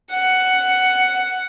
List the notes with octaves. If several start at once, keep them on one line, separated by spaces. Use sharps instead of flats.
F#5